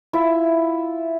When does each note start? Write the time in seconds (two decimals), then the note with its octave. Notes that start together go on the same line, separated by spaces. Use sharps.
0.13 E4 F4 E5